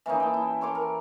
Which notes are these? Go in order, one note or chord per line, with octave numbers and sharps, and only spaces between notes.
E3 A#3 C#4 D#4
G5 A5
E4
A4 C#5 C6 D6
A#4